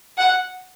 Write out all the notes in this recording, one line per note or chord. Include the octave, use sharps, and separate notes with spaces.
F#5